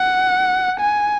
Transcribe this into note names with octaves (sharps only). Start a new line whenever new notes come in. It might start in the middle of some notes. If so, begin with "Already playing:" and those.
Already playing: F#5
G#5